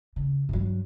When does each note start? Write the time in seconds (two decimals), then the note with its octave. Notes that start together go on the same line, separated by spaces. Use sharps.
0.16 C#3
0.49 G2 F#3